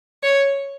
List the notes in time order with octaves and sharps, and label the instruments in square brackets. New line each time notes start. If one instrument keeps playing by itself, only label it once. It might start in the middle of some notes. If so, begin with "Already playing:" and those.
[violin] C#5